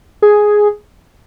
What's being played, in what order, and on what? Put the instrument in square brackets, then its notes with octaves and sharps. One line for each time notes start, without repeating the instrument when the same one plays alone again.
[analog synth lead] G#4